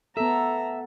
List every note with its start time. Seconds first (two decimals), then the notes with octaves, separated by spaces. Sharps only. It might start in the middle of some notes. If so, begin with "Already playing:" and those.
0.17 B3 A4 E5 A#5